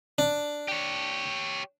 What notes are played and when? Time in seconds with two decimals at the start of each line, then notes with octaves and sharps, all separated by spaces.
0.18 D4
0.68 G4 C#5